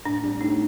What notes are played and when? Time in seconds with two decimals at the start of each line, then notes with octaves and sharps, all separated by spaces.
0.05 A2 D4
0.24 G3 C4 D4
0.41 A2 D#4